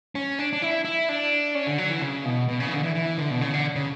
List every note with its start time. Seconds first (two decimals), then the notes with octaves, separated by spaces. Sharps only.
0.15 C#4
0.39 D4
0.53 D4
0.62 E4
0.85 E4
1.09 D4
1.55 C#4
1.67 D3
1.78 F#3
1.90 E3
2.01 C#3
2.25 B2
2.48 B2
2.60 C#3
2.67 E3
2.72 D3
2.83 E3
2.95 E3
3.18 D3
3.31 B2
3.41 C#3
3.54 D3
3.76 C#3